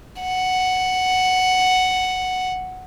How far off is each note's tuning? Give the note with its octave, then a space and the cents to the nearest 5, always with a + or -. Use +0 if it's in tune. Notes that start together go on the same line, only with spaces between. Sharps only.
F#5 +5